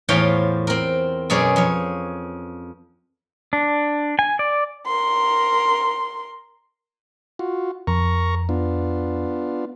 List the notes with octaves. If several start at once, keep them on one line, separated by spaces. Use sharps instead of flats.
E2 A2 F4 C5 C#5 G5
C4 A#4
F#2 B2 G#4 C#5 D5
F2 C#5
D4
G#5
D5
A#4 C6
F4 F#4
F2 A#4 A#5 C#6
B3 D4 F4